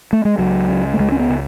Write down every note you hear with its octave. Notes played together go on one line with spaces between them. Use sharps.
A3
G#3
C#2 F#3
C#3
A3
C#2 G#3
C#4
B3
C#3